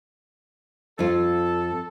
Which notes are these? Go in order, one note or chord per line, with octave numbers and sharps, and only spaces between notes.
F2 F4 A4